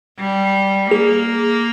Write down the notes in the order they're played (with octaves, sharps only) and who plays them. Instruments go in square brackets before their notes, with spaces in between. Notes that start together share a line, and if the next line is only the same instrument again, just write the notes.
[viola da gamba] G3
[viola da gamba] A#3 [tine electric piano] G#4